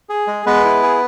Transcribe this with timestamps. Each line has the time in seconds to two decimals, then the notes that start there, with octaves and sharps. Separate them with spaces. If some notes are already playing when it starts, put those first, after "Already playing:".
0.09 G#4
0.27 G#3
0.46 G#3 B3 B4
0.65 E4
0.83 G#4